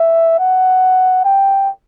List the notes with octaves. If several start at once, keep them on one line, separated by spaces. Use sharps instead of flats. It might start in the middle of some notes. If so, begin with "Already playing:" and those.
Already playing: E5
F#5
G5